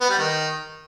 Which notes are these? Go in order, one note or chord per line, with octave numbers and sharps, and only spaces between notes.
B3
G3
D#3